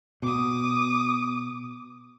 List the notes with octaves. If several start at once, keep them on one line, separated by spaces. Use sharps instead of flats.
B2 D6 D#6